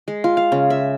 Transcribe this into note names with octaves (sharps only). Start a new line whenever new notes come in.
G#3
F4
F5
C#3
E5